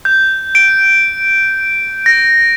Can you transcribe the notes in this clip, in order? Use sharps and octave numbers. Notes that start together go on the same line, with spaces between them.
G6
D7
A#6